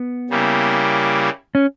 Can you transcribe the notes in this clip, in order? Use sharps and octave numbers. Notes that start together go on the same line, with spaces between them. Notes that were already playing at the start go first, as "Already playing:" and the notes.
Already playing: B3
C#3 G3 A#3 E4 G4
C#4